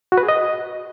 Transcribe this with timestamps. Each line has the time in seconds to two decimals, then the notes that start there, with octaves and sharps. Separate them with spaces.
0.12 F#4
0.18 B4
0.23 G#4
0.28 D#5